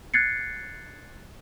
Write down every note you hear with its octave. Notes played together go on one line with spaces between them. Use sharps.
F#6 G#6 A6 C7 C#7